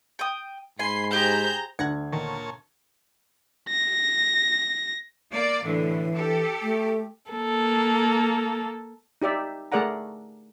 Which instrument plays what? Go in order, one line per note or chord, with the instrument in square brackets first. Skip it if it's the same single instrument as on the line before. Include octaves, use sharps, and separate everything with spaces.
[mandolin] G5 D#6
[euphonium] G#2 [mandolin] G#5 [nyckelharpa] B5 C6 [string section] C7
[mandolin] G4 [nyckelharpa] G#4 C5 [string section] A#5 G6
[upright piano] D2 D4 G#6 [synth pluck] F#5 A#6 C#7
[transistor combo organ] A#2 C#5 A5 [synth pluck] D#3
[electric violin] A#6
[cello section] A#3 D5
[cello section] A2 D3 [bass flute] E3
[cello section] G4 A4
[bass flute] A3
[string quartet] A#3 A4
[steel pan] D#4 G4 D5 E5
A3 G#4 A#4 D5 F#5 A#5